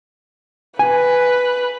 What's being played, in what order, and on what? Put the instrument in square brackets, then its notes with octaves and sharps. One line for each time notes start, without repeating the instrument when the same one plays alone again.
[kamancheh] B4 [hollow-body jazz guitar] G#5